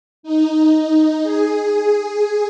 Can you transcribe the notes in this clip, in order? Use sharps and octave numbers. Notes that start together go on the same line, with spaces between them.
D#4
G#4